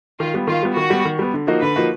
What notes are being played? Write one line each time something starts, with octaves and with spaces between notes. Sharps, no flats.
D#3 F4
G3 B3
D#3 F4
G3 B3
D#3 F#4
G3 B3
D#3
G3 B3
D3
F3 A#3 D#4 F#4
D3 B4
F3 A#3 D#4 F#4